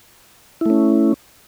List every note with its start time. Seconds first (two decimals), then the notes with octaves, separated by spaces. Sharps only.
0.61 E4
0.66 A3
0.70 C#4